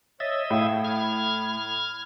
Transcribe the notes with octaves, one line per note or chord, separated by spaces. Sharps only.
C#5 D#5 E5 A6
A2 A3 F5
B5 F6 G#6